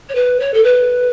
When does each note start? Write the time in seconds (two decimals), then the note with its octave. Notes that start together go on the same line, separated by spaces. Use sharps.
0.09 C#5
0.15 B4
0.40 C#5
0.53 A4
0.64 B4